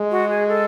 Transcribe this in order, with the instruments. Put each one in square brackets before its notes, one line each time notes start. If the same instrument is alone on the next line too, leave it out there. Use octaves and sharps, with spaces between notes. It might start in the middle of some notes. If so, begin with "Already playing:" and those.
Already playing: [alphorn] G#3
[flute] F#4
G#4
A4